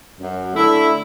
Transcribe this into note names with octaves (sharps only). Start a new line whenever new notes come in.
F#2
D3 A3 E4